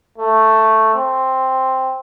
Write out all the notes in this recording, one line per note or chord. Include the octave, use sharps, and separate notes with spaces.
A3
C4